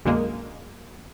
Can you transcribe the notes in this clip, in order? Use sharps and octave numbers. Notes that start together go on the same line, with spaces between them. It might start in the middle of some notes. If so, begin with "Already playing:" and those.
B1 F#2 D3 G#3 A#3